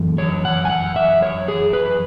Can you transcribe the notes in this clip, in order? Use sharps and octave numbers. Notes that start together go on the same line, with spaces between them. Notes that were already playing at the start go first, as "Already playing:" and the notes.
Already playing: F#2 E3
C#5
F#5
G#5
F#5
E5
C#5
G#4
B4